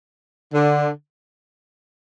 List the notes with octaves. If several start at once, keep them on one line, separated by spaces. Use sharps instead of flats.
D3